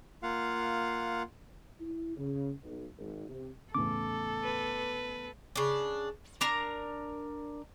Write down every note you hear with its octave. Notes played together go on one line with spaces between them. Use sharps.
A#3 F4 F5 F#5
E4
C#3
B1
G#1
C3
E2 A2 C#3 A4 D6
B4
C#3 D4
D4 A#4 A#5